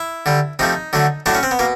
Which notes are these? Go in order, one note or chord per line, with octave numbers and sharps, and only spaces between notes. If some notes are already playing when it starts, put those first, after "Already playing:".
Already playing: E4
D3 G3
C3 F3 A3 D#4
D3 F#3 A3
A2 F#3 A3 D4
C#4
C4
B3
B2 A#3